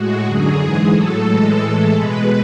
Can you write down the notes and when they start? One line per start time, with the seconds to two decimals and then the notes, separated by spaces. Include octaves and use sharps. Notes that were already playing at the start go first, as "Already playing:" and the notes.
Already playing: A2 G#3 F#4
0.24 F#2 D3 F#3 G#4
0.58 G#2 E3 G#3
0.91 A2 F#3 A4
1.26 A2 E3 G#3 A4
1.60 A2 E3 G#3
1.93 B2 G#3 B4